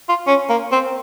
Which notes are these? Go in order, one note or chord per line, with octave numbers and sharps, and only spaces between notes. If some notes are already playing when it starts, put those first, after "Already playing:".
F4
C#4
A#3
C4